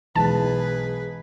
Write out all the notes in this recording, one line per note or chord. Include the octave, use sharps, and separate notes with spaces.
B1 E3 G#3 G#4 B4 A5